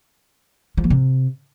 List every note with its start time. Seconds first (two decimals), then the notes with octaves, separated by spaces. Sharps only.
0.77 F3
0.84 A#3
0.90 C3